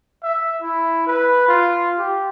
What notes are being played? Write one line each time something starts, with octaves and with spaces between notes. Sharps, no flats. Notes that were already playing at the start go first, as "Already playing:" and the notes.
E5
E4
B4
F4
G4